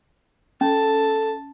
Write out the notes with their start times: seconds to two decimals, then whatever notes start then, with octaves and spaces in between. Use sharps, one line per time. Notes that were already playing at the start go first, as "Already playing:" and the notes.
0.61 C#4 A4 A5